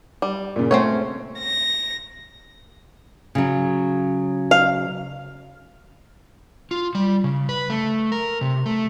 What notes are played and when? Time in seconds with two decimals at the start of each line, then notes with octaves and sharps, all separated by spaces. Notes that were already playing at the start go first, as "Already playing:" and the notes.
0.22 G3
0.56 A#2 C#3
0.71 A3 C4 C#4 C#5
1.39 A#6
3.35 C#3 F#3
4.51 F5
6.71 F4
6.95 G3
7.24 C#3
7.49 B4
7.70 A3
8.12 A#4
8.41 C3
8.66 A3